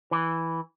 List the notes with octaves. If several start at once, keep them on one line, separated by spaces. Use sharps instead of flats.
E3